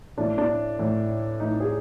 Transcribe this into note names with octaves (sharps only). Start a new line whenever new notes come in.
A2 E3 D4
D4
A2 E3
A2 E3 D#4
G#4